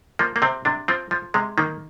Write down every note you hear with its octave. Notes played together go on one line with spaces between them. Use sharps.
F3 A#3
A#3
C3 C4
C3 D4
F3 C4
F3
C3 G#3
D#3 A#3